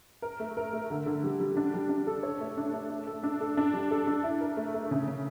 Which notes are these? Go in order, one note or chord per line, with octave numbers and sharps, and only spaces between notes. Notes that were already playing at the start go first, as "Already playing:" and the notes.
A#4
A3
A#4
A3
D3
D3
G3
G3
D4
G3
D4
A4
C#5
A3
D4
A3
A3
A4
D4
A4
D4
G3
A4
D4
E4
A#4
A3
A3
C#3
C#3